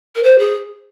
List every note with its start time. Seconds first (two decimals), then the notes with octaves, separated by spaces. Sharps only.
0.15 A#4
0.23 C5
0.38 G#4